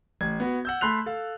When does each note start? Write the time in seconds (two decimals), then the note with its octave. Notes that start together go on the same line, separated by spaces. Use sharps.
0.21 A1 G#6
0.40 B3 F#4
0.65 F#5 E6 G6
0.81 A3 B5 C6 F#6 F7
1.06 A4 F5